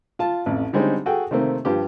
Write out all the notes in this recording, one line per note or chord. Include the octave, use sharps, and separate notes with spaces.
F4 A5
A1 F2
D3 G3 G#3 C4 C#4 D#4
F#4 G#4 A4 G5
C3 D#3 A3 A#3 C4
G2 F3 G4